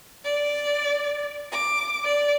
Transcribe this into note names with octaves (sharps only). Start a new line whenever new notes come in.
D5
D6
D5